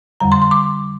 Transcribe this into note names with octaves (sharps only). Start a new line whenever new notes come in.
F2 D3 G3 A#5
C6
C6
D6